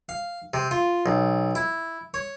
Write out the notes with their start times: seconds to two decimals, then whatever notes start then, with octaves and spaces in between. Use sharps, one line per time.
0.09 F5
0.54 C3
0.71 F4
1.06 B1
1.55 E4
2.14 C#5